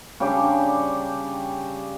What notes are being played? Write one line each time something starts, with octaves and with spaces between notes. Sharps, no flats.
C#3 G3 D4 G4